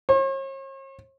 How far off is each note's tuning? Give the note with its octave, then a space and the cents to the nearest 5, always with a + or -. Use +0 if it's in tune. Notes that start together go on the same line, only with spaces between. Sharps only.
C#5 -45